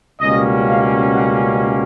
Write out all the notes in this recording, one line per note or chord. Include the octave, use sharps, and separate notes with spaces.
C#2 B2 G3 A#3 C#4 D#5
F5
F#5